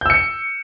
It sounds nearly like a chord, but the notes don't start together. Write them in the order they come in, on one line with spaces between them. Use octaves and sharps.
G6 E6 C#7